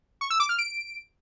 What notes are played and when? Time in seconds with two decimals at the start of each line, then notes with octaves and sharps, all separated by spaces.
0.21 C#6
0.30 E6
0.40 D6
0.49 F6
0.59 D7